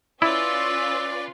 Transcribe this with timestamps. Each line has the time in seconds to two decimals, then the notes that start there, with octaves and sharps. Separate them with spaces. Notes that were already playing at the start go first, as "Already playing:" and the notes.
0.22 C#4 E4 F4 B4 D5 E6